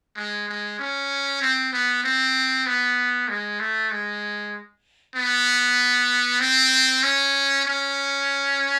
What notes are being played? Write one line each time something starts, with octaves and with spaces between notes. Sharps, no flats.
G#3
G#3
C#4
C4
B3
C4
B3
G#3
A3
G#3
B3
C4
C#4
C#4